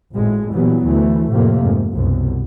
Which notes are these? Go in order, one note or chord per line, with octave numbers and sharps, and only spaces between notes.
G#1 A2 G#3
A#2 E3 F#3 G3 B3
D2 E3 A3
F2 A2 C3 A3 A#3
G#2
C2 F#2 B2